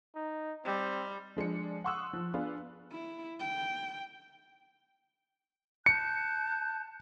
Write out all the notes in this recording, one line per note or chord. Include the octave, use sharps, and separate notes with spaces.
D#4
G3 C4
F3 G#3 D4 C#7
F#5 C6 C#6 D#6 E6 F#6
F3
B3 D4 F4 G#4 B4
E4
G5
A5 F#6 G6 C#7